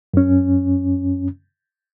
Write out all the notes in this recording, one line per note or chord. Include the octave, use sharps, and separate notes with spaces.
F#2 C#4